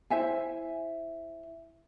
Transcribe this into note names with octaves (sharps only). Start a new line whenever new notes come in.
E4 C5 E5 G#5